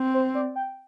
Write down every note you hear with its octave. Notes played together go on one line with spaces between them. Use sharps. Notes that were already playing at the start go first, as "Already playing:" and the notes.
Already playing: C4
C5
D5
G5